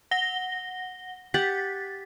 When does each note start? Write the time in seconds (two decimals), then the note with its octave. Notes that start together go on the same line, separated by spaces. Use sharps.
0.11 F#5 A#6 G7
1.34 G4 F#5 A6 B6